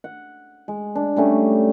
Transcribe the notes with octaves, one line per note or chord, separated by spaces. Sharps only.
F#5
G#3
D4
G3 A3 C#4